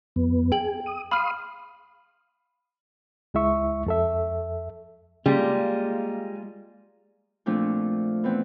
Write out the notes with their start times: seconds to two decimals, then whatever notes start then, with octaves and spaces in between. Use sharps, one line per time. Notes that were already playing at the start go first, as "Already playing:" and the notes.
0.16 F2 B3
0.52 G#4 G5 F#7
0.86 D#6
1.11 F5 B5 C6 D#6 F6
3.34 C#2 G#3 E4 E5 C#6
3.86 F2 A4 E5
5.26 C#3 G3 G#3 A#3 F4
7.46 A#2 F3 A3 C4 D4
8.24 E3 B3 C4